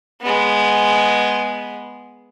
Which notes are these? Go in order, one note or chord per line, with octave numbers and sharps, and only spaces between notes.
G#3 B3